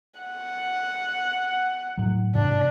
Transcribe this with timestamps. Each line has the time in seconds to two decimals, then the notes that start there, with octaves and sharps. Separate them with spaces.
0.20 F#5
1.98 A2 F#3
2.35 G#2 C3 E3 D4